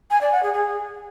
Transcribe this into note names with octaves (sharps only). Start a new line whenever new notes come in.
G#5
D5
F#5
G#4
G#4